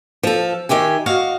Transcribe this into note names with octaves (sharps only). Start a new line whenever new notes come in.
F3 A4
D#3 G4 E5 G#5
F#4 D#5 F5